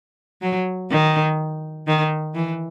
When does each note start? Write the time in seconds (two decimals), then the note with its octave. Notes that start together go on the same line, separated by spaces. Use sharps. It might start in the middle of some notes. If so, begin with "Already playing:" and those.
0.42 F#3
0.91 D#3
1.87 D#3
2.35 E3